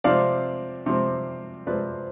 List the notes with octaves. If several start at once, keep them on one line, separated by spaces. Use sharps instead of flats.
C3 F3 C4 D5 F5
C3 F3 C4
C3 F3 C4 B4 D5